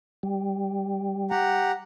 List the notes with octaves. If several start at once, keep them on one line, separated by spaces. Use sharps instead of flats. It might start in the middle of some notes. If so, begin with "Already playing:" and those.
G3
G4 F#5 A#5